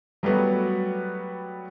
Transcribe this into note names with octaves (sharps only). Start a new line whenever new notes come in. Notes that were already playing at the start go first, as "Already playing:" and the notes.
F#3 G3 A3 B3 F#4